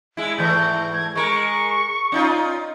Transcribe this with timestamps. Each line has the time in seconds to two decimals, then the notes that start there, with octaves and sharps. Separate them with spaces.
0.17 G#3 E4
0.38 G#2 E3 A3 G6
0.93 G#6
1.15 G#3 A#4 C#6
2.12 C#4 D#4 F4